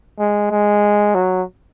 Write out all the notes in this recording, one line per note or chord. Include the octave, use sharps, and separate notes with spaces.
G#3
G#3
F#3